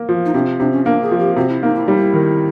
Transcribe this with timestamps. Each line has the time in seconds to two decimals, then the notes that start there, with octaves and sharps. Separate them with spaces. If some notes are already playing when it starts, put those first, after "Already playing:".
Already playing: A#3
0.09 F3
0.25 D#4
0.34 C3 D4
0.60 C3 D4
0.72 C#4
0.85 A#3 D4
1.03 G#4
1.11 F3
1.19 G4
1.36 C3 F#4
1.49 E4
1.62 A#3 D#4
1.75 E4
1.86 G3 D#4
1.97 E4
2.14 D#3